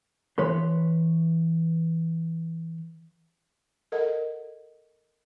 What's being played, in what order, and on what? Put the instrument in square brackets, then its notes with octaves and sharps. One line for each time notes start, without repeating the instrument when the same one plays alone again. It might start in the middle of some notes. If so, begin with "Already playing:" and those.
[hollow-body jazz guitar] E3 B4 C#5 C6
[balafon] A4 A#4 D#5 F#5